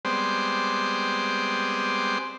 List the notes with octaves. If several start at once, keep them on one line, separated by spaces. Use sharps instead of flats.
G3 G#3 B3 C4 C5 D5